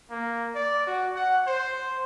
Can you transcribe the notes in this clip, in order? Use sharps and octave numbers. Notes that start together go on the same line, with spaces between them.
A#3
D5
F#4
F#5
C5